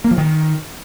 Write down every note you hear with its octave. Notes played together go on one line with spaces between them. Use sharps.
A#3
F3
D#3